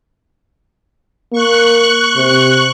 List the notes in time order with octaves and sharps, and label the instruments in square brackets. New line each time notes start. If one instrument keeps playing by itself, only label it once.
[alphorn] A#3 [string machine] C#6 F#6
[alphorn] C3